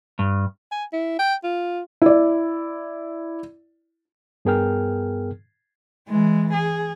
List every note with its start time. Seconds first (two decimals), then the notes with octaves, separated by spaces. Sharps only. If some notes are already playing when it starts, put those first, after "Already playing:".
0.19 G2
0.72 G#5
0.93 E4
1.19 G5
1.44 F4
2.02 E4 D5
4.45 G2 B3 G#4 A#4 G5 F6
6.08 E3 G#3
6.53 G#4